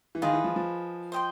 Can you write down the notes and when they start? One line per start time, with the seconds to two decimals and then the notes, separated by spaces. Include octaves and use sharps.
0.15 E3
0.22 D#3 F4 G#4 B4 D#5
0.33 E3
0.44 F3
0.56 F3
1.12 C5 D#5 G5 C6